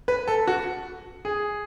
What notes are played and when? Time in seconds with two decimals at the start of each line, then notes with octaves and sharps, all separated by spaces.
0.08 B4
0.28 A4
0.47 F#4
1.25 G#4